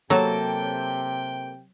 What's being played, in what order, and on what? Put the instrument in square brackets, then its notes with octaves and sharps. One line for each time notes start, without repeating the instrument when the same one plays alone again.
[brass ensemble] C3 G5 [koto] F#3 [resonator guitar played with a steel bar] A#3 A4